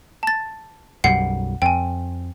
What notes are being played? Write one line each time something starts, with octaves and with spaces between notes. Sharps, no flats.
A5 A6
B1 F#2 G3 F#5 C7
F2 G5 G#5